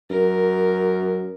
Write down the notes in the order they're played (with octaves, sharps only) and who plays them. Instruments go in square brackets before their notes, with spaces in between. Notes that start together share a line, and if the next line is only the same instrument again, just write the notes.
[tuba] F#2 [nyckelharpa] A#4